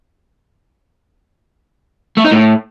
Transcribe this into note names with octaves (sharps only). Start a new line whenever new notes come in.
A3
D#4
A2